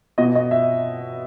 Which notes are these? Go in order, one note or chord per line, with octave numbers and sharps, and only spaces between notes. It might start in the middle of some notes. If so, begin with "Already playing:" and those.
B2 D#5
D#5
E5